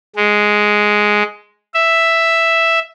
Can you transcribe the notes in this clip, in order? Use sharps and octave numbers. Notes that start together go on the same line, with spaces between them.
G#3
E5